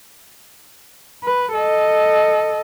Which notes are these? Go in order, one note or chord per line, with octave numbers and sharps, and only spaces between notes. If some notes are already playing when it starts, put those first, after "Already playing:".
B4
A4 D#5